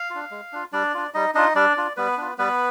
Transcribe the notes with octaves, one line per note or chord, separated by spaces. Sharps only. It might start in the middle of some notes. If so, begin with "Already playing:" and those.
Already playing: F5
D4 F4
G#3
D4 F4
G3 D4 D5
D4 F4
G3 D#4 D#5
D4 D#4 F4 D#5
G3 D4 D5
D4 F4
G3 B3 B4
D4 F4
G3 B3 B4